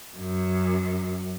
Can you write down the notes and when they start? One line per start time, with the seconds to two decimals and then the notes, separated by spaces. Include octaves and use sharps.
0.18 F#2